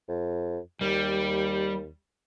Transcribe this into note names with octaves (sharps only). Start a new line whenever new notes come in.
F2
D#2 G3